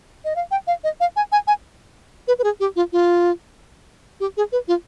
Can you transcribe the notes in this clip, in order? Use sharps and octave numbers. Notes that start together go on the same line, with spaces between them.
D#5
F5
G5
F5
D#5
F5
G#5
G#5
G#5
B4
B4
G#4
G4
F4
F4
G4
G#4
B4
F4